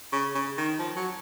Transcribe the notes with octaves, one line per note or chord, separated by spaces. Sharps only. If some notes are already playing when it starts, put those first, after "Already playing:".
C#3
C#3
D#3
F3
F#3